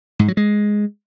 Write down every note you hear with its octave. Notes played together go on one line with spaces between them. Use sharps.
G#2
F#3
G#3